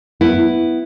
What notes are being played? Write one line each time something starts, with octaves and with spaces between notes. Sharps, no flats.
B3 E4